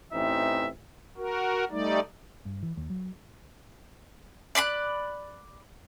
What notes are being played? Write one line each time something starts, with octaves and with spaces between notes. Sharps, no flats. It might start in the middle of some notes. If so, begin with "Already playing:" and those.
A1 E3 C4 D#4 E5
F#4 A#4
G3 A3 D#4 D5
G2
E3
D#2
F#3
D5 B5 C6 F#6